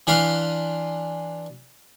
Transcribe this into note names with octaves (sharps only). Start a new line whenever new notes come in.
E3 D4 B4 F5 C6